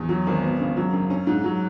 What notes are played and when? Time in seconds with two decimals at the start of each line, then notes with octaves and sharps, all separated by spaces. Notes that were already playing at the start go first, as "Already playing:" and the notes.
Already playing: E2
0.09 F#3
0.27 G#1
0.43 B3
0.60 C#3
0.77 F#3
0.93 F#2
1.10 C#4
1.27 G#2
1.44 F#3